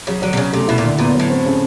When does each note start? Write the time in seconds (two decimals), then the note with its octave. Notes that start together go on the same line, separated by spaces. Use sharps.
0.07 C#3 F#3
0.22 D3 F#3
0.33 C3
0.37 C#3 C#4
0.53 C3 A3
0.68 B2 E4
0.78 A#2
0.84 D3
0.98 A#2 B3
1.14 F#3
1.20 A2
1.30 C4
1.46 C#3